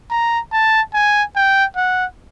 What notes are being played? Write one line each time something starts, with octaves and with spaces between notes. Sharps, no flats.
A#5
A5
G#5
G5
F#5